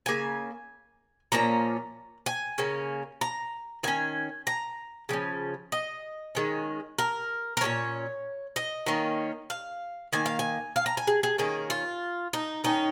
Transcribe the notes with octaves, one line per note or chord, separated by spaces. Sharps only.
C#3 A#3 G#5
A#2 F3 A#3 C#4 A#5
G#5
C#3 A#3 C#4
A#5
D#3 C#4 G#5
A#5
C#3 F3 C#4
D#5
D#3 G#3 C#4
A#4
A#4
A#2 A#3 C#4 C#5
D#5
D#3 A#3 C#4
F5
D#3 A#3 G#5
F5
G#5
F5
A#5
G#5
G#4
G#4
D#3 A#3 C#4 G#4
F4
D#4
D#3 C#4 D#4